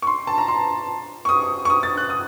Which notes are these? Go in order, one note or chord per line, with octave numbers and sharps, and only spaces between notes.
C#6
C6
A5
A#5
C6
C#6
D#6
C#6
D#6
A6
F#6
D#6